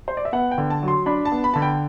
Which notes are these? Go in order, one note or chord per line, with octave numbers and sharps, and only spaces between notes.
C5
D5
E5
B3 F#5
G5
D3
A5
F#3
C6
D4 B5
A5
B3
B5
D3 A5
G5